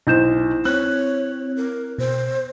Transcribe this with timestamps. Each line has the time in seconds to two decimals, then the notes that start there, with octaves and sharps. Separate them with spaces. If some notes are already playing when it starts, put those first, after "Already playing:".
0.07 B1 E4 C5 G6 E7
0.65 C4 C#5 F#6
1.56 A#4
1.98 B2 C5